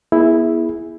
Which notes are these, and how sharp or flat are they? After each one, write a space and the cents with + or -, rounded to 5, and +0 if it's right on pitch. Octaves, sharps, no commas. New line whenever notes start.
B3 -35 E4 +0 G#4 -5